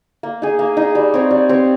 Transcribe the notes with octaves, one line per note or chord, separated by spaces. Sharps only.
A#3
D#4 G#4
A#3
D#4
G#4
G3
C4 G4 C#5
G3
C4 G4 C#5